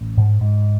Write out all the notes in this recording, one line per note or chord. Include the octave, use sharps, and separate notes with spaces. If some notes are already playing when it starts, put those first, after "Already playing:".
Already playing: A1
G#2
G#2